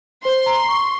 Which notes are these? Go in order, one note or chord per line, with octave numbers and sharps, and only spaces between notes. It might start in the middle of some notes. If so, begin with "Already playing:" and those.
C5 C6
A#5
C#6